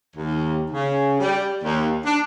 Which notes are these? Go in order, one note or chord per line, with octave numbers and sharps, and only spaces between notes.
D#2
C#3
G3
D#2
D4